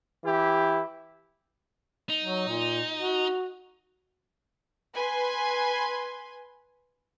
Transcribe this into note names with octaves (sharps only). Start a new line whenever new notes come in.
E3 E4 G4
D#4
F#3
A#2
F#4
B4 G#5 C6